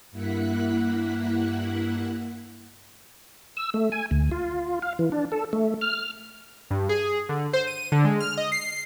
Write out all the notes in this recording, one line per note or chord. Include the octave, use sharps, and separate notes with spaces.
G2 A#3 E4 F#5 F#6 B6
E6
A3
G#5
D2
F4
F5
E3
D4
A4
A3
F6
G2
G#4
D3
C5
D#7
D3
G#3
F6
D#5
C7